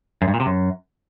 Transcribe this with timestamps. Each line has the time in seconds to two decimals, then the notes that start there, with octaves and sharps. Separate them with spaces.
0.22 F#2
0.28 G2
0.34 A#2
0.40 C3
0.46 F#2